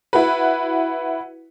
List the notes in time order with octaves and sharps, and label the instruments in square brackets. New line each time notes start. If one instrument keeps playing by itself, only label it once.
[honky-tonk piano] E4 F#4 B4